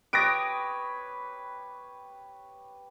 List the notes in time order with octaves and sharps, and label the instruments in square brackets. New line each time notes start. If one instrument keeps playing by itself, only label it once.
[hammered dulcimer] G4 B4 C#5 [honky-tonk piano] D#6 A#6 D7